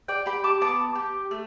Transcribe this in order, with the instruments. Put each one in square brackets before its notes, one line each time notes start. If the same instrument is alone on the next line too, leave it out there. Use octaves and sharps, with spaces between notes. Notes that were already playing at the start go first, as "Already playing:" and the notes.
[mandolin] D5 G5
G4 G5 B5
A5 D6
B3 A5 D6
G4
A3